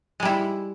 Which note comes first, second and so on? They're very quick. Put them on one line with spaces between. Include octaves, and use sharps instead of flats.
G#3 G3 E4